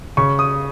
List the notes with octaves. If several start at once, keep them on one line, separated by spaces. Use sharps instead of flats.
C#3 C#6
D#6